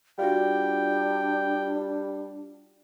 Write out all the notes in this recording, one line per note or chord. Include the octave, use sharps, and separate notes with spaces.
G3 D4 F4 F#4 G5